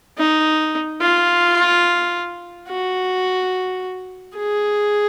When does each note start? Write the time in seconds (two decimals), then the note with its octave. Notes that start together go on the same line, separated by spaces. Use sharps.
0.18 D#4
1.01 F4
2.69 F#4
4.37 G#4